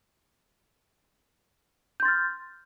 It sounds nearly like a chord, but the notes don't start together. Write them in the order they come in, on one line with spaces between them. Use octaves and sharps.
G6 C6 A6 F6